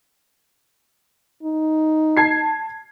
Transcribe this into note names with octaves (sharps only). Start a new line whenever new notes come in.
D#4
A5 G#6 C7